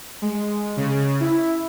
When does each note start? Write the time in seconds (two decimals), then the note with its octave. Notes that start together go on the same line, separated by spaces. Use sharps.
0.22 G#3
0.77 C#3
1.20 E4